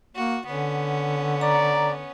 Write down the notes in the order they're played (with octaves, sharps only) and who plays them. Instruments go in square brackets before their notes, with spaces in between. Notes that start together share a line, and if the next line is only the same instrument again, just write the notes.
[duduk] A#3 [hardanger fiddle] F#4
[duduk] D3 [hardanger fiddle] B3 C#4
[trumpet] D5 [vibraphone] A#5